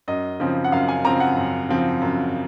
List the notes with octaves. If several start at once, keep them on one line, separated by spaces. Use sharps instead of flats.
F#2 D#5
C#3 F3 C4
F#5
F#2 F5
G#5
C#3 F3 C4 A#5
F#5
F#2
C#3 F3 C4
F#2